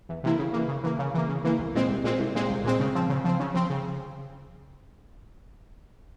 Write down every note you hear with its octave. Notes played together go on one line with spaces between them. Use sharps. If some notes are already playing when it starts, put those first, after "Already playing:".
E2
C3 E3 A#3 E4
C#3
E3 A#3
C#3
E3 A#3
C#3
E3 A#3
C#3
E3 A#3
C2
A#2 G#3 C4
C2
A#2 G#3 C4
C2
A#2 G#3 C4
C2
A#2 G#3 C4
C#3
F3 C4
C#3
F3 C4
C#3
F3 C4
C#3